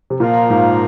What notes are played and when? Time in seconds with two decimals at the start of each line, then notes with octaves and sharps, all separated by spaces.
0.10 C3
0.20 A#2 F3 A#3 F4 A#4
0.50 G#2